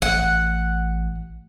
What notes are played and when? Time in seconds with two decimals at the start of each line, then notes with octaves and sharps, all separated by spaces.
0.02 A1 F#5